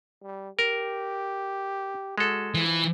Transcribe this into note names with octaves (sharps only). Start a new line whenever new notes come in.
G3
G4 A#4
G#3 F#4 A4
E3 F3